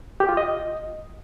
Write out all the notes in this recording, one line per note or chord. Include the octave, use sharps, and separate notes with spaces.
G4
F4
D#5